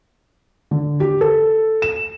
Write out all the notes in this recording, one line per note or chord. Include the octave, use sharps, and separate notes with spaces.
D3
G4
A4
E7